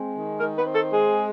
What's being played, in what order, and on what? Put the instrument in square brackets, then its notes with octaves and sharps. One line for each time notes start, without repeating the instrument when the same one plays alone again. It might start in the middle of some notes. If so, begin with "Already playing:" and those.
Already playing: [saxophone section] G#3 C4
D#3
D#3 A#4
B4
C4
A4
G#3 G#4